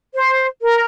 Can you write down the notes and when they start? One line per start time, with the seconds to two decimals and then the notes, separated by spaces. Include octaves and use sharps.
0.14 C5
0.61 A#4